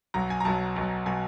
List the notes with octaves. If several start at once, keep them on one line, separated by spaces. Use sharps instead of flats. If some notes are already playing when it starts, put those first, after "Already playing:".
B1 B2 F#3 A#5
G#5
A#5
B1 B2 F#3 A5
B1 B2 F#3
B2 F#3 G#5